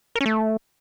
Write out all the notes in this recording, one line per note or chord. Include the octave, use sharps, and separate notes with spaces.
A#4
C#4
A3